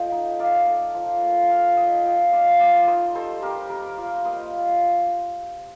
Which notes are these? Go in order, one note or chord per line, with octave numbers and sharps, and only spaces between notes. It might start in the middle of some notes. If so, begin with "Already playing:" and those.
Already playing: A3 F4 D#5 G5
D#4
D#4 D5 F5
A3
F3
A#3
F3 D5 F5
D#4 D#5 G5
F3 D#5 G5
C4 D5 F5
F3 D5 F5
D#4 C5 D#5
G3 A4 C5
C4 G4 A#4
G3 A#4 D5
F4 D5 F5
A#3 C5 D#5
F4